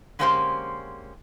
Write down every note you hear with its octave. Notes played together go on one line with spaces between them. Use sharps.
D3 G#3 A#3 C#4 G4 C5